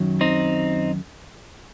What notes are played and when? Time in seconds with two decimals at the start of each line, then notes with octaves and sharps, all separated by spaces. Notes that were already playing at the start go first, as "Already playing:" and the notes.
Already playing: F#2 D#3 F#3
0.21 C4 D#4